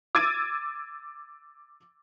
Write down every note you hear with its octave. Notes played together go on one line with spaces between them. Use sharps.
D6 E6 G#6 A6 D7 D#7